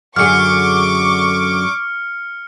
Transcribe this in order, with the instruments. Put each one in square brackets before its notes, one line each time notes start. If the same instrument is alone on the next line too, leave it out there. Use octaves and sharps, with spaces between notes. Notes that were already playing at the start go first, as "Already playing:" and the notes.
[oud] F#2 D3 G#4 [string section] C#6 D6 [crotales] F6 C#7